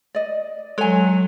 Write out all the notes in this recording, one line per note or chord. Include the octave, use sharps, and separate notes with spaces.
D5 D#5
F#3 G#3 A4 C#5 G#5 F7